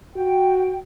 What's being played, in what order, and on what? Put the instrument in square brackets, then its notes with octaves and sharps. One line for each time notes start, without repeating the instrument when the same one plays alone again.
[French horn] F#4 [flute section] G5